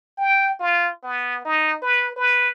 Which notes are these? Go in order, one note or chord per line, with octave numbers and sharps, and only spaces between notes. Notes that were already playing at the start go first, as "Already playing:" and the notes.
G5
F4
B3
D#4
B4
B4